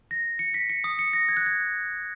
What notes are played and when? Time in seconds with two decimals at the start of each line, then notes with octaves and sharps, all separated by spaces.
0.11 A#6
0.39 C#7
0.54 B6
0.70 C#7
0.84 D#6
0.99 C#7
1.13 A#6
1.29 G#6
1.37 F#6
1.46 G#6